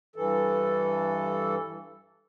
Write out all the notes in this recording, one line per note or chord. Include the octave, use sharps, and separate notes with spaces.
G2 E3 A4